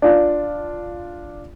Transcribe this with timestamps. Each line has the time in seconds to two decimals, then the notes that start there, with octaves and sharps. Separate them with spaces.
0.02 D4 F4